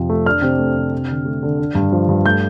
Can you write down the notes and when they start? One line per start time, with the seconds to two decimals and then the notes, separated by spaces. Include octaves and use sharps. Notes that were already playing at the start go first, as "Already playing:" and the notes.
Already playing: F2 C3 F3 C4
0.09 A3
0.26 D4 F6
0.42 C3
0.59 A3
0.76 C3
0.92 D4
1.10 D3
1.25 A3
1.43 D3
1.59 D4
1.75 G2
1.92 F3
2.09 G2
2.25 A3 G6